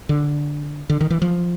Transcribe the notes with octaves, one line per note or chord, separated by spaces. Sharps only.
D3
D3
D#3
E3
F3